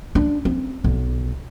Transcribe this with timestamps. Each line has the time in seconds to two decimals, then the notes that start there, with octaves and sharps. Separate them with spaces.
0.15 D4
0.45 C4
0.84 B1